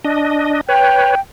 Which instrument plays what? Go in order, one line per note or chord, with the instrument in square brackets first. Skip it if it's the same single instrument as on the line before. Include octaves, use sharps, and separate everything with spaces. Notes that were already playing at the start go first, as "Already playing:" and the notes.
[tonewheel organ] D4 D#5
[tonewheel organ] B4 C#5 [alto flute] G5